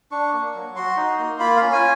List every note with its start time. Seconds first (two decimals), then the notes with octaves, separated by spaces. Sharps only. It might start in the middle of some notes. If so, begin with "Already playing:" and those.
0.12 D4 C#6
0.33 A#3
0.54 F#3
0.76 F#4 C6
0.97 D#4
1.19 A#3
1.39 F4 B5
1.56 F5
1.62 C#4
1.72 G#5